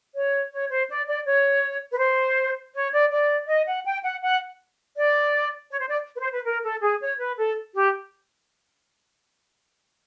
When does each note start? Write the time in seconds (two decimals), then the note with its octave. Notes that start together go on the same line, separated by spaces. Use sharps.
0.14 C#5
0.52 C#5
0.70 C5
0.89 D5
1.07 D5
1.26 C#5
1.92 B4
1.99 C5
2.75 C#5
2.93 D5
3.11 D5
3.48 D#5
3.67 F#5
3.86 G5
4.03 F#5
4.22 F#5
4.96 D5
5.71 C#5
5.80 C5
5.89 D5
6.15 B4
6.19 C5
6.32 B4
6.45 A#4
6.63 A4
6.82 G#4
7.01 C#5
7.19 B4
7.38 A4
7.74 G4